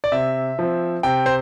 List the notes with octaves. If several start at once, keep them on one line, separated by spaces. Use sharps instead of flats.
D5
C3 E5
F3 C4
C3 G5
C5